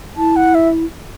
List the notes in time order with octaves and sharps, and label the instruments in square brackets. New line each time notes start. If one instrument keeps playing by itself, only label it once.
[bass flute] E4 [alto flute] A5
[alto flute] F#5
E5